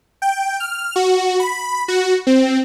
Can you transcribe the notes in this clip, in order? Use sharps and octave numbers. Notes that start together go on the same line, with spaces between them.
G5
F6
F#4
B5
F#4
C4